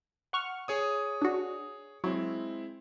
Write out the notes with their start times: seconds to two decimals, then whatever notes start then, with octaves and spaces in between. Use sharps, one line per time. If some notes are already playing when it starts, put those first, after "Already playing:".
0.33 F#5 C#6 F6
0.68 G#4 C#5 D#6
1.22 D4 F#4
2.04 F#3 G#3 C4 E4